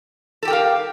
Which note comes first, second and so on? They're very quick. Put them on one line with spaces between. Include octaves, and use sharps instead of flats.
A4 G4 G5 A#4 F5